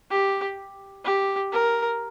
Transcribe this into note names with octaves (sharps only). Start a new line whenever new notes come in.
G4
G4
A#4